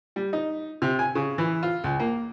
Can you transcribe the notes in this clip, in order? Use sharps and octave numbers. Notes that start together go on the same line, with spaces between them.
G3
D#4
C3
G#5
C#3
E3
F4
C#2
A#3